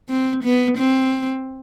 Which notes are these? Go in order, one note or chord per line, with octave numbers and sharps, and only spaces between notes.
C4
B3
C4